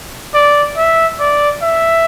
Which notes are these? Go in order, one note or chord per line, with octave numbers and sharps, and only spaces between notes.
D5
E5
D5
E5